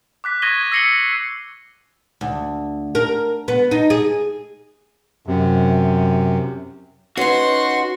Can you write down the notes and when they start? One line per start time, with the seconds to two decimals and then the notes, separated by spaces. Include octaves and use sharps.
0.24 D6 F#6 B6
0.42 C#6 D#6 G#6 A#6 D#7 G7
0.72 E6 A#6 C7 C#7 F#7 G7
2.21 D2
2.95 A#4
3.48 B3
3.71 D#4
3.90 G#4
5.26 F#2 C3
7.17 C#4 D#4 F#4 B4 C6